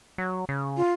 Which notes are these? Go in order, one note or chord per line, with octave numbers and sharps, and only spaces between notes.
F#3
C#3
F4